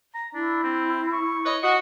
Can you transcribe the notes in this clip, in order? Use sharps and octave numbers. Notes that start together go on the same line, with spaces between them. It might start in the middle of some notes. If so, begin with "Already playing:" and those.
A#5
D4 E4
C4
C#6
B4 C#5 D#5
F#4 D#5